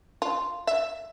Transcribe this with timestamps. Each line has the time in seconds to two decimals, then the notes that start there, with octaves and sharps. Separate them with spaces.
0.22 F4
0.67 E5